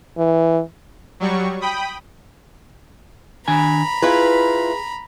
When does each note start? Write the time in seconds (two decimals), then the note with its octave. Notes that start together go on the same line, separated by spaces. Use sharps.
0.18 E3
1.20 F#3 G3 C#6
1.61 G5 B5 D#6
3.48 D#3 D4 G#5 A#5 B5
4.02 E4 F4 G#4 B4